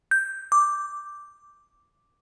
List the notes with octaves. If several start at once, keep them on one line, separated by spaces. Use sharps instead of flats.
G6
D6